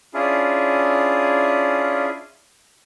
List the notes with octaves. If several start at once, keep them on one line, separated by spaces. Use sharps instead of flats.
C#4 D4 E4 F4 G#4